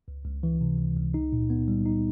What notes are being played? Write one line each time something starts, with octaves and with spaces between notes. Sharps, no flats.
C#2
C#2
E3
C3
C#2
C#2
D#4
A#2
B3
G3
D#4